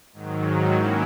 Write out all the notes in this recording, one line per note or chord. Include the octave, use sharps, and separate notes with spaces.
G#2 D#3 F#3
F#3 A#3 C#4 E4